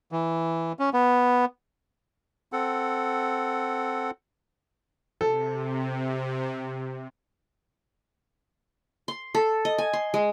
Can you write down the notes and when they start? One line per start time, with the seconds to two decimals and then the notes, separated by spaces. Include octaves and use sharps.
0.12 E3
0.79 C#4
0.94 B3
2.53 C4 A4 F#5
5.21 C3 A4
9.08 C6
9.35 A4
9.65 D#5
9.78 G#5
9.93 C6
10.14 G#3